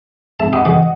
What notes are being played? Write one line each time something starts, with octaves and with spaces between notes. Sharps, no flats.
G#2 C4 E5 A5
G4 D#5 F#5 D#6
E2 C3 E3